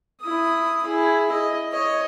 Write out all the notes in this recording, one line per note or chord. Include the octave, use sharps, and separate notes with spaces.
E4 D#6
E4 G#4
D#5
C#5 D#5